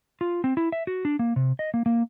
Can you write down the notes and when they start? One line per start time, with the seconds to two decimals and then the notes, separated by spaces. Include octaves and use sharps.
0.21 F4
0.44 C4
0.57 E4
0.72 E5
0.87 F#4
1.05 D4
1.19 A#3
1.36 C3
1.59 D#5
1.74 A#3
1.86 A#3